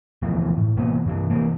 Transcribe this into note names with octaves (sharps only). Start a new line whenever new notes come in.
D2 B2 E3 F3
A2
C3 E3 A#3 B3
G2 C3 E3
C3 E3 A#3